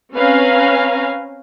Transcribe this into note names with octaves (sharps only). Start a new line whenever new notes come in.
C4 C#4 B4 F5 G#5 A#5